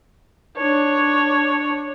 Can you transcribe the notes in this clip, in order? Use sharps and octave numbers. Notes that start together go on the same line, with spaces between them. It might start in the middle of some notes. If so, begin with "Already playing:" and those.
D4 C#5